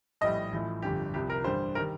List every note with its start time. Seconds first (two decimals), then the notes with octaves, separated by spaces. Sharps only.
0.21 A#1 A2 G3 D#5
0.52 A1 A2 F3
0.82 G1 F2 D3 G4
1.14 C2 C3 F3 G4
1.30 A#4
1.44 A1 G2 D3 G3 C5
1.75 D#3 G3 A#4